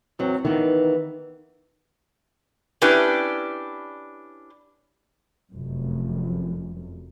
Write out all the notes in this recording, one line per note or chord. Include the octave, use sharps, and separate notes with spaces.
E2 F#3 C4
D#3 E3 B3
C#4 D4 E4 G4 B4
F1 F#2